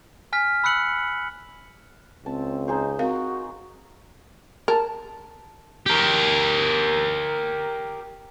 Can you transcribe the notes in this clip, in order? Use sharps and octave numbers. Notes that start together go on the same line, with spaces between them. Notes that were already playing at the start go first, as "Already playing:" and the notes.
G#5 F6 B6
B5 E6 F#6 C#7 F#7
C#2 C4 A5
D#4 G#4 C5
C4 F#4 A#4 F5
A#4 A5
G4 A#4